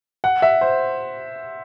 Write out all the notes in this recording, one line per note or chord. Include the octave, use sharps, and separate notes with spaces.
F#5
E5
C5